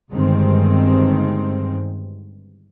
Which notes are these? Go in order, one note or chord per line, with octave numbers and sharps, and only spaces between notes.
G1 G2 D#3 G#3 C4